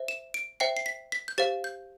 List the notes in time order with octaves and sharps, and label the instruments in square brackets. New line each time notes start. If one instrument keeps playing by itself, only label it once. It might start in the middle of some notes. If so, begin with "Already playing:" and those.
Already playing: [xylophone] C5 E5
E7
D7
C5 E5 G5 C7
C7
B6
B6
G6
G4 C5 F5 A6
G6